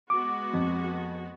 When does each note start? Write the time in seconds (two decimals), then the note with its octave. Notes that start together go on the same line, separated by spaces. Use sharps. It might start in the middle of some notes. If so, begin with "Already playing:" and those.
0.10 G#3 B3 F#4 D6
0.54 F2